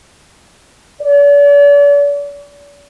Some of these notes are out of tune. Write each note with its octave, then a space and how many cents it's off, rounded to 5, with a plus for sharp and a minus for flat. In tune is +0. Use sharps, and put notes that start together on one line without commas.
D5 -45